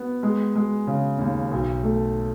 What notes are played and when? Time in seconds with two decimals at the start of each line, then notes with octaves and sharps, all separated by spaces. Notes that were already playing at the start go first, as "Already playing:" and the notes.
Already playing: B3
0.23 G#3
0.56 G#3
0.87 C#3
1.19 D#2
1.51 B1
1.83 A3